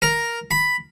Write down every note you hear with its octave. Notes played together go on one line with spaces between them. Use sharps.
A#4
B5